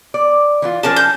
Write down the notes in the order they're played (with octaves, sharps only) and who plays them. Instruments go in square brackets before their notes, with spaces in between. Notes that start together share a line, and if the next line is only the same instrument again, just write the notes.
[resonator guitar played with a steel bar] D5
E3 E4 F4
[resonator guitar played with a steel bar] F3 C#4 G#4 [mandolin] A#4 D5 A5
[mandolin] G6